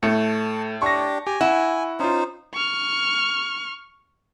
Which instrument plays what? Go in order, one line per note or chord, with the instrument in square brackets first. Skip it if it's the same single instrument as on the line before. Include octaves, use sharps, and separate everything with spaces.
[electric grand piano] A2 [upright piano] A3 C#7 [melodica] A5
[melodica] D4 G4 [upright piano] C#6 A#6
[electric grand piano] G4 [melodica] G#5
[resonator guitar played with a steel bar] E4 [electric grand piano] F#5
[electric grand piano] C#4 F4 [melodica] D#4 C5
[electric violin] C#6 F6